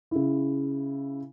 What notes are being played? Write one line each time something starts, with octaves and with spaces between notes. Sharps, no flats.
C#3 E4